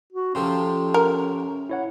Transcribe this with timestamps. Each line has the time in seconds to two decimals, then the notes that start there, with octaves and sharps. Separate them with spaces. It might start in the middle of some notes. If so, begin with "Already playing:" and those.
0.13 F#4
0.35 C3 F3 C#4 A4 G5 C6
0.94 A#4
1.70 E4 C#5 F#5